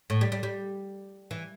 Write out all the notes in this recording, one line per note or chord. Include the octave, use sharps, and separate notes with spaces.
A2
G3
G3
G3
E3